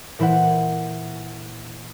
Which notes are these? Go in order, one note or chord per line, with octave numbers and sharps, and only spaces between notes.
A#2 E3 E4 C5 F#5